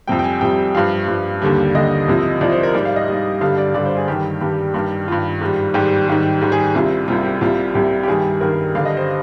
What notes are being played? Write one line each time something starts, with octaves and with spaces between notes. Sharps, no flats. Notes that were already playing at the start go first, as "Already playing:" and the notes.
F2 C3 G3 G5
G5
G#5
F2 C3 G3 G5
G2 F3 F5
G2 F3
D#2 D3 G3
D#2 D3 G3 D#5
C2 C3 F3
C2 C3 F3 D5
C5
A#4
G#2 G3 D5
F5
D#5
G#2 G3
G2 D3 G3 F5
D5
G2 D3 G3 D5
C5
G#4
G2 D#3 G3 G4
G2 D#3 G3
G2 D#3 G3
G2 D#3 G3 F4
G#2 D#3 G3
G#2 D#3 G3 G4
G#2 D#3 G3
G#2 D#3 G3
G#4
C2 C3 G3 F4
C2 C3 G3 F4
G4
C2 C3 G3 F4
C2 C3 G3 G4
G4
G2 D#3 G3 G#4
G2 D#3 G3 A#4
G2 D3 G3 F5
D#5
C5